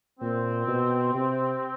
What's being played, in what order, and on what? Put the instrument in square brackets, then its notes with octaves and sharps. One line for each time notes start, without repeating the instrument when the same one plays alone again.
[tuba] A#2 [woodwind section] C4
[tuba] B2
C3